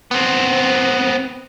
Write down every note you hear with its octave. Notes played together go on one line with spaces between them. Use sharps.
B3 C4